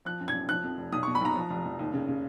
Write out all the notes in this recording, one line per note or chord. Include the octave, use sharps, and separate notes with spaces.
F3 F#6
F#2
G#6
F#2
F3 F#6
F2
F1
B1 D#6
C#6
B2
B5
B1 A#5
F3
F1
F1
D#2
C#3
C#3